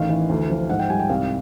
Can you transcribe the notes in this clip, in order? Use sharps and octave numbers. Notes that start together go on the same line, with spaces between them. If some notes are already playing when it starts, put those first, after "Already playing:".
Already playing: A1 D#3 F5
E3
D2
F3
G#2 F#5
G5
G3 G#5
G5
C2 F5